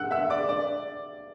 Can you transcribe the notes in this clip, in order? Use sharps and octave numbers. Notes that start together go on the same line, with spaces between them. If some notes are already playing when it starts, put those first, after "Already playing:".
Already playing: F#5 E6 F#6
E5 E6
D5 D6
D5 D6